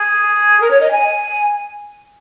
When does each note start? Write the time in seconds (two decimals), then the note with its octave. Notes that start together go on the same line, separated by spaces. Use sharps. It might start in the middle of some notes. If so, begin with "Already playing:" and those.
Already playing: G#4
0.60 A#4
0.70 C#5
0.80 D#5
0.91 G#5